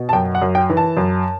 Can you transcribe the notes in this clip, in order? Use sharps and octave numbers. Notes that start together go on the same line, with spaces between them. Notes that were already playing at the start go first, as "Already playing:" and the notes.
Already playing: B2
A5
F#2 G5
F#5
F#2
G5
E3
A5
F#2